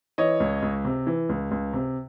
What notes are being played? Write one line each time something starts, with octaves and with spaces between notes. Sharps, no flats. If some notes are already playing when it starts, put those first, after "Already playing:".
E3 C#5 D#5
C#2
C#2
C3
E3
C#2
C#2
C3